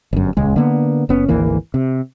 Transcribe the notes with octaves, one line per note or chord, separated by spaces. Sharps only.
G1 F#2
D#1 C#2 G#3
D3 A#3 B3
F#1 B3 C#4
G#1 D2 E3 A#3
C3